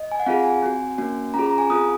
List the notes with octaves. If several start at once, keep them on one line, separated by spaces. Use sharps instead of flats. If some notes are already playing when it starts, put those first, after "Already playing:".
Already playing: D#5
G#5
F#5
C4 F4 G#4 F5
G#5
C4 F#4
A#3 C#4 F#4
C#4 F4 G#4 A#5
A#5
G#5
C4 F4 G#4 D#6